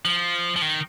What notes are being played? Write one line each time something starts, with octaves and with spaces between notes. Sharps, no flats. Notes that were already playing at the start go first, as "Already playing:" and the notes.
F3
F3
D#3